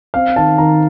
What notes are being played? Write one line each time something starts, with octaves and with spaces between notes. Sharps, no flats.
C4 F5
D#3 A5
D#3 A#5